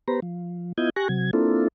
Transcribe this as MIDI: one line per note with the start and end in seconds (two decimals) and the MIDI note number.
0.08 0.20 59
0.08 0.20 67
0.08 0.20 71
0.08 0.20 72
0.08 0.20 82
0.22 0.72 53
0.78 0.90 59
0.78 0.90 64
0.78 0.90 65
0.78 0.90 75
0.78 0.90 91
0.78 0.90 92
0.96 1.08 67
0.96 1.08 80
0.96 1.08 85
0.96 1.08 90
0.96 1.08 94
1.09 1.31 48
1.09 1.31 54
1.09 1.31 92
1.33 1.68 58
1.33 1.68 60
1.33 1.68 62
1.33 1.68 64
1.33 1.68 65
1.33 1.68 69